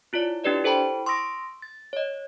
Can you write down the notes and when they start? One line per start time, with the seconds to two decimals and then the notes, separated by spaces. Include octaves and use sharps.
0.13 E4 F4 C#5 D5
0.44 D4 E4 G4 B4 D5 D#5
0.64 E4 A4 C5 G5 A5 B5
1.06 C6 C#6 D#6 E6 A#6 D7
1.62 A6
1.93 C#5 D#5